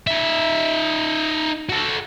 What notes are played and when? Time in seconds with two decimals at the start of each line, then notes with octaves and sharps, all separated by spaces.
0.07 D#4 E5
1.69 F#4 A4